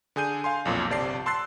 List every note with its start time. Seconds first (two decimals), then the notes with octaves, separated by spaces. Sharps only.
0.16 D3 G#4 G#5 G6 D#7
0.44 F5 G#5 C6
0.65 B1 F2 A#2
0.90 G1 C3 D5 A5 C7
1.26 A5 C6 E6 F#6 A6 C7